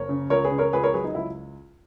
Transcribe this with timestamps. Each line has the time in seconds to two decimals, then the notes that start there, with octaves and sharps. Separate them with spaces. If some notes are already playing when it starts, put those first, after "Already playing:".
Already playing: F#1 A#4 C#5
0.09 C#3
0.30 C#2 A#4 C#5
0.44 G#4 B4
0.51 C#3
0.58 A#4 C#5
0.73 C#2 G#4 B4
0.83 A#4 C#5
0.94 F#3 G#4 B4
1.04 D#4
1.15 C#2 E4